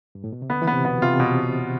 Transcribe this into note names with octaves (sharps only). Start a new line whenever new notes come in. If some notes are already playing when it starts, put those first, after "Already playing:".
G2
A2
B2
C3
D3 B3
E3
B3
C3
B2 B3
C3 F4
B2